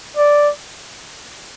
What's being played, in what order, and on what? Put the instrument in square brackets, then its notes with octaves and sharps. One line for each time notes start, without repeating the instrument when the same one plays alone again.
[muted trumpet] D5